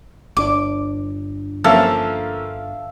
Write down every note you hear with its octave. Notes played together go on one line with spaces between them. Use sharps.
G1 D4 D6
F3 A#3 C#4 A4 E5 F5